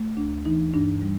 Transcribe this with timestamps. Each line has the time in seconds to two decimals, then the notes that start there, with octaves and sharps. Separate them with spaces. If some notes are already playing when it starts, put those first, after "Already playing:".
Already playing: A3
0.17 D2 D4
0.45 E3 D#4
0.74 G2 D4
1.02 G3